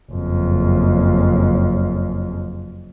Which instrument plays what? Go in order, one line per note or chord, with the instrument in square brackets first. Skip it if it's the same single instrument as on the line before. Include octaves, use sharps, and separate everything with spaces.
[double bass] F#1 F2